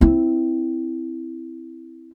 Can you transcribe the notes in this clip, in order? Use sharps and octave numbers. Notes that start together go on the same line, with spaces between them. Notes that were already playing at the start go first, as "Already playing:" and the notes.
C4 E4